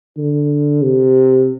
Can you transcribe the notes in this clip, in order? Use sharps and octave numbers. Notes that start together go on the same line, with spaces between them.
D3
C3